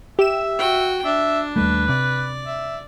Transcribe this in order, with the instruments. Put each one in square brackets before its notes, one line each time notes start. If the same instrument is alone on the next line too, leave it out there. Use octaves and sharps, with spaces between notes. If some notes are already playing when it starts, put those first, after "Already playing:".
[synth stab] G4 E7 [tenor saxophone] E5
[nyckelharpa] F#4 G5
[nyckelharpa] D4 [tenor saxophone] E5
[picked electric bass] D#2 G3 A3 [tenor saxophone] B4
[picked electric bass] C3 [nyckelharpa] D5
[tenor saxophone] E5